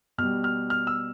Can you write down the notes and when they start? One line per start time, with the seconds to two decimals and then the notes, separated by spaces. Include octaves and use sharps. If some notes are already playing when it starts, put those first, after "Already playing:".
0.18 B2 F6
0.23 G3
0.44 F6
0.70 F6
0.87 E6